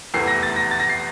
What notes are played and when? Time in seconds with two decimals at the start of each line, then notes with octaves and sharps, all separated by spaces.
0.14 F1 E2 E3 A3 C7
0.28 A#6
0.43 A6
0.56 A#6
0.71 A6
0.80 A#6
0.89 C7